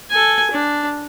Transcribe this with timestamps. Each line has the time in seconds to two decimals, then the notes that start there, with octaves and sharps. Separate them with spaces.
0.10 A4 G#5
0.51 D4